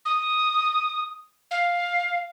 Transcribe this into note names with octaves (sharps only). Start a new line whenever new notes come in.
D#6
F5